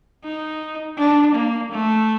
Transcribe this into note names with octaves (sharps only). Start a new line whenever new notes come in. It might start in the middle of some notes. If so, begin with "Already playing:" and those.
D#4
D4
A#3
A3